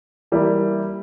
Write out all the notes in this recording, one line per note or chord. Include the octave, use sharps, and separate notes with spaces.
E3 G3 A#3 E4